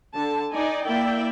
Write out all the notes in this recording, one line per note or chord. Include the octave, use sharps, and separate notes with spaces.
D3 A5
D#4 D5 G#5
A#3 E4 D5 E5 G5